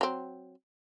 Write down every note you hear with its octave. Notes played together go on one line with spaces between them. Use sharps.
F#3 C4